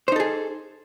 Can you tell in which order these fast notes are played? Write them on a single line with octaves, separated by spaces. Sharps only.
C5 D#4 A4 G#4